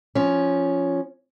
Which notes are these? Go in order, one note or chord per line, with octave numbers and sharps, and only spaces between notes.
F3 C#4